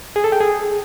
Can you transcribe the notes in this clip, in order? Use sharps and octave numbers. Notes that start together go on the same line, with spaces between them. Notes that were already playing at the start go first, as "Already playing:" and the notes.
G#4
A4
G5
G#4